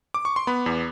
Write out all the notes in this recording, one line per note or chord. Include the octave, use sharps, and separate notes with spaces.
D6
C#6
C6
B3 B5
E2